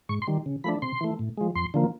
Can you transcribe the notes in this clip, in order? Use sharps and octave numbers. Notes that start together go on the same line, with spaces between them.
G#2 C#6
C6
D#3 G3
C#3
F3 A3 D4 B5
C3 C6
E3 A3
A2
F3 G#3
F2 C6
D3 F3 A#3